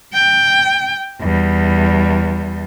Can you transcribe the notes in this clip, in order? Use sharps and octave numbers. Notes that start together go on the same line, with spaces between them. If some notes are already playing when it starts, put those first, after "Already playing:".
G5
E2 G3